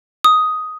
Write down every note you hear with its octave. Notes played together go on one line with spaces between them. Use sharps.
D#6